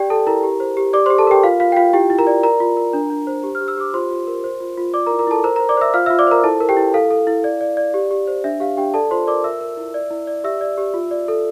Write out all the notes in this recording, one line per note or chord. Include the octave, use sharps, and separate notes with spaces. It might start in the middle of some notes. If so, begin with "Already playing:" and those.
Already playing: G4 D5 G5
A4 A5
E4 A#4 A#5
G4
C5
G4
G4 D5 D6
C5 C6
G4
A4 A5
G4 A#4 G5
F4 F5
F4 F5
G5
F4 F5
E4 G4 G5
E4
A#4 A#5
D5
A#4 A#5
F4
A#4
D4
D4
C5
G4
F6
G4
E6
G4 D6
F4 C5 C6
F4
A#4
C5
F4
F4
D5 D6
A#4 A#5
E4
A#4 A#5
E4 A4 A5
A#4 C5 A#5
A#4 C5 A#5
D5 D6
C5 E5 E6
F4 F5 F6
E5 E6
F4
D5 D6
A#4 C5 A#5
E4 A4 A5
A#4
G4 G5
E4
A4 F5
A4
E4
D5
D5
D5
G4
G4
C5
D4 E5
G4 F5
D4 G4 G5
A4 D5 A5
F4 C5 C6
A#4 D5 D6
A#4 E5 E6
A#4
E4
D5
E4
D5
G4 E5 E6
D5
G4
F4
D5
A4